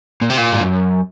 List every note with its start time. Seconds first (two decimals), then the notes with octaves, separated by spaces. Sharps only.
0.21 A#2
0.30 C3
0.38 A#2
0.52 G#2
0.61 F#2